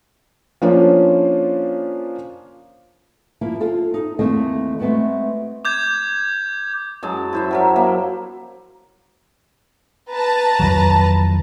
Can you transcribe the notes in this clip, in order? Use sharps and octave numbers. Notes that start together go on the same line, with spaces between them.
F3 A#3 C#4 D4 F4 C5
F3 A#3 E4 F4
F4 A4 C5
D#4
D#2 E3 A3 A#3 C4 D#5
G#3 A3 B3 C4 F#4
D6 G6 G#6
F#2 G#3 A5
E4 C5 E5
F#3 A#4 E5
A#3
B4 A5 A#5
F2 D#3 F#3